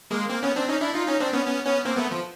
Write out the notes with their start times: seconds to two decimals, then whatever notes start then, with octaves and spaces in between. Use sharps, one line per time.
0.11 G#3 A#3
0.29 A#3 C4
0.43 B3 C#4
0.56 C4 D4
0.68 C#4 D#4
0.81 D4 E4
0.94 D#4 F4
1.07 C#4 D#4
1.20 C4 D4
1.33 B3 C#4
1.46 B3 C#4
1.65 B3 C#4
1.85 A#3 C4
1.97 A3 B3
2.11 F3